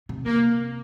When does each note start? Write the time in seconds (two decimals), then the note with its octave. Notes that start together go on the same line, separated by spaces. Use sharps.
0.09 C3
0.26 C3 A#3